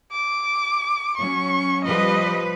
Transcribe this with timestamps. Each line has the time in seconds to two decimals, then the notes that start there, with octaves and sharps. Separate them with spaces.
0.12 D6
1.17 F#3 C#4 C#6
1.85 F3 G3 B4 D#5